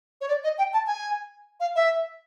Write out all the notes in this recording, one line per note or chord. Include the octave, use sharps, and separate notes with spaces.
C#5
D5
D#5
G5
A5
G#5
F5
E5